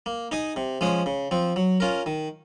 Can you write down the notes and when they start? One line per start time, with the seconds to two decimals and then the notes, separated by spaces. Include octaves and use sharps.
0.06 A#3
0.32 D#4 G#4 D#5
0.56 C3
0.81 F3 G#3 C#4 G#4
1.06 C#3
1.31 F3 C4
1.56 F#3
1.80 C#4 F4 A#4
2.06 D#3